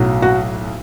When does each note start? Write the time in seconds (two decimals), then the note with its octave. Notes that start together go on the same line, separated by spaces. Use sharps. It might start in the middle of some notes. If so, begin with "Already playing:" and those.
Already playing: B1 A2 F#3
0.22 F#4